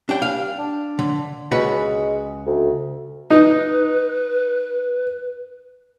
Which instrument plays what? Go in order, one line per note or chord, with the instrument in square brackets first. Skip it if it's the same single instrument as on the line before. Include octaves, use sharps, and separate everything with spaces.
[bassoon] G3 [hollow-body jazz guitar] D4 G5
[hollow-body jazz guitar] F5
[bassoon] D4
[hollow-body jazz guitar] D3
[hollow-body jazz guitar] C#2 F#4 B4 [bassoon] G#3
[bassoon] D2
[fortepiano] D#4 [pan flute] B4